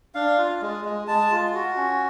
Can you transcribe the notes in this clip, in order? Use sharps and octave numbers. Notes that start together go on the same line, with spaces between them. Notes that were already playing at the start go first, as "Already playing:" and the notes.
D4 F5
F4
G#3
G#3
G#3 A5
F4
F#4
C#4